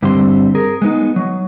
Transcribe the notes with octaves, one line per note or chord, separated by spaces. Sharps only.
G2 D3 G3 C4 C6
G#4 A#4
G#3 B3 D#4
F#3